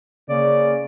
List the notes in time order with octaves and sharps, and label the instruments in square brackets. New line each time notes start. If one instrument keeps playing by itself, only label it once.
[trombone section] C#3 A#3 [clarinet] D5